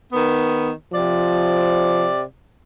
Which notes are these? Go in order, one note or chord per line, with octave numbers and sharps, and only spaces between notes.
D#3 B3
C3 F3 D5